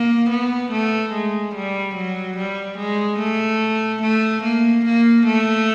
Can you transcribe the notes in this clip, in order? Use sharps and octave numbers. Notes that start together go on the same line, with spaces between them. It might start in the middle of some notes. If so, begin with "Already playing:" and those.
Already playing: A#3
B3
A3
G#3
G3
F#3
G3
G#3
A3
A3
A#3
A#3
A3